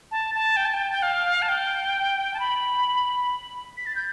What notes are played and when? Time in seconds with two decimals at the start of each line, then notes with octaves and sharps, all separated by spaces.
0.11 A5
0.35 A5
0.57 G5
0.65 A5
0.74 G5
0.91 G5
1.02 F5
1.42 A5
1.49 G5
2.34 A5
2.40 B5
3.77 B6
3.86 A6
3.96 G6